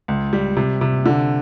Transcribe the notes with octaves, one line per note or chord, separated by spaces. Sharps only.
C#2
G3
C3
C3
D3